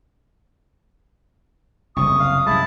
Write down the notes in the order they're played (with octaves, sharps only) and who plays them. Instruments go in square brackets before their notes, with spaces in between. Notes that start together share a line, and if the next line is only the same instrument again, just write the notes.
[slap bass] F#1 C2 [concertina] C#6 [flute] D#6
[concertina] F5
[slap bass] F#2 C3 G#3 [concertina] E4 A5